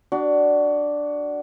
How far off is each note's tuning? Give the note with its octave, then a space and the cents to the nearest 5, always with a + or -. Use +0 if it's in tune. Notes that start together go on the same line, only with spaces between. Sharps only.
D4 +0 F#4 +20